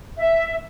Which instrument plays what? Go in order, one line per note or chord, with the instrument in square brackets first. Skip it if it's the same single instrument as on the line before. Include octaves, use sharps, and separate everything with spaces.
[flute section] E5